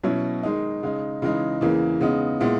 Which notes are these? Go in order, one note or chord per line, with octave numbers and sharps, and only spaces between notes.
B2 F#3 C#4 E4
D#3 G#3 D#4
C#3 G#3 D#4
C#3 E3 G#3 D#4
E2 C#3 E3 A#3
C#3 G#3 B3 D#4
A#2 G#3 B3 E4